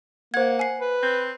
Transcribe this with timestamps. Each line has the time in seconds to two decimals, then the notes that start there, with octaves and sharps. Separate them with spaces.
0.34 A#3 C5 F#5 G#6
0.59 G#5 C7
0.80 B4
1.03 C4